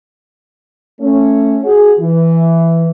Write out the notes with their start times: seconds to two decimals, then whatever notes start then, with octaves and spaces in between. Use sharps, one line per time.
1.01 A3 C#4
1.64 F#4 G#4
1.99 E3